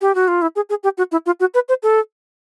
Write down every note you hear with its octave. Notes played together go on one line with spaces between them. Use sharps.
G4
F#4
F4
E4
G#4
G#4
G4
F#4
E4
F4
F#4
B4
C5
A4